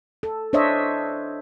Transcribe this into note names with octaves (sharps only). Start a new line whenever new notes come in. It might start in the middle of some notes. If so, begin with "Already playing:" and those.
A4
D4 C5 C#5 D#5 E5